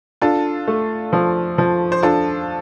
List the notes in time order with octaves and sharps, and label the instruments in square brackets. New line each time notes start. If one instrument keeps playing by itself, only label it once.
[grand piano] D4 [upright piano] F4 A4
[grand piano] A3
F3
F3
[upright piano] C5
[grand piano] D4 [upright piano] F4 A4